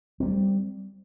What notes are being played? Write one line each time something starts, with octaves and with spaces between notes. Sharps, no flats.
G3 A#3 C4